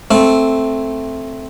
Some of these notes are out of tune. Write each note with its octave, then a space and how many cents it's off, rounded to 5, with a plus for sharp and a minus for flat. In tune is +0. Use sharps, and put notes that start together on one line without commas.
A3 +0 C4 +0